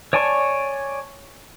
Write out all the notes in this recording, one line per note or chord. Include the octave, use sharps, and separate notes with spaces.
C#5 D5 G#5 A5 C#6